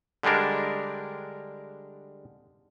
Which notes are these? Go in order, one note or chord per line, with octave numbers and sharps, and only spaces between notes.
D3 G3 G#3 D4 A#4